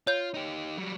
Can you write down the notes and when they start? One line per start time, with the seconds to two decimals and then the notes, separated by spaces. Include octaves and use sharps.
0.07 F4 C#5 G6
0.34 D#4 G4
0.77 F#3 G3